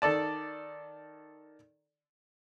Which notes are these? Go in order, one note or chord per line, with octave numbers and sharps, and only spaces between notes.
D#3 A4 D5 A5